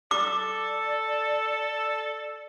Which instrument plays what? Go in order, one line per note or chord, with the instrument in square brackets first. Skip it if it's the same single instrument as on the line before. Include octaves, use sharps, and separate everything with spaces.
[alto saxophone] A4 [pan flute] D5 [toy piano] D6